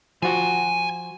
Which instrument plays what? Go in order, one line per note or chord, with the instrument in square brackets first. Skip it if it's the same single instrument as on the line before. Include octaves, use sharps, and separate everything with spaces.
[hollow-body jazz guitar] F3 F#4 [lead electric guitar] F#5 G#5